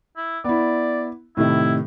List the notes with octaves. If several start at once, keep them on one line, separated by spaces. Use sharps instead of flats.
E4
B3 E4 D5
A2 C3 D#3 E4